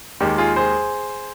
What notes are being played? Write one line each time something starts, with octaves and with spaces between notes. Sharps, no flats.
D#2 D#3 G#3 G4
F4 G#4
G#4 C5